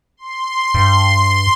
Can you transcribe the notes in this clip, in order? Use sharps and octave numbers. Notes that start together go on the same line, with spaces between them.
C6
G2